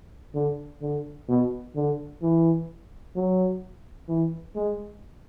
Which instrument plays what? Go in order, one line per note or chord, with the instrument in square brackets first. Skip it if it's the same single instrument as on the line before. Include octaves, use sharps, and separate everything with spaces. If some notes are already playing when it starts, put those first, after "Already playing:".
[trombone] D3
D3
B2
D3
E3
F#3
E3
G#3